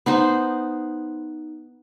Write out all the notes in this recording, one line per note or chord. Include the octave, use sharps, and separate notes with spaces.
B3 D#4 C5